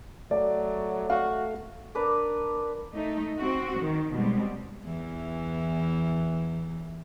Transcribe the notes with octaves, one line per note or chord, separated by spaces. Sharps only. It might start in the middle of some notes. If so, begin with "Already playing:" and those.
F#3 A3 D5
F#4 F5
D4 A#4 B4 D6
A3 D#4
C4 F#4
D#3
B2 G3 G#3 C4
E2 E3